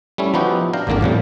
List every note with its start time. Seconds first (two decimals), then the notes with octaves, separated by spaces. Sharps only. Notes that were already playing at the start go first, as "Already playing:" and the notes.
0.18 G3 A3 C#4 E4
0.34 F3 B3 D#4 E4 F#4 G4
0.73 D4 F5 G5 A#5
0.87 G#1 E2 D3 A#3 D4 A#4
1.01 F2 A2 F3 G3